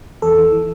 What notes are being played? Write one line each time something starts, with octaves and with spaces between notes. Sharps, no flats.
E2 A4
E3
E3